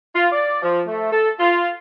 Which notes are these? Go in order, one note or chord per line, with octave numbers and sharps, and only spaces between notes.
F4
D5
F3
A3
A4
F4